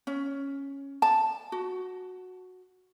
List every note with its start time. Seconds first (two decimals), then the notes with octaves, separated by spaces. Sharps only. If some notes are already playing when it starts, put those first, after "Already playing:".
0.07 C#4
1.02 A5
1.52 F#4